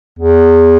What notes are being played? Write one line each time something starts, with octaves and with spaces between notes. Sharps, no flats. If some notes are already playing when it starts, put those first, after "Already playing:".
E2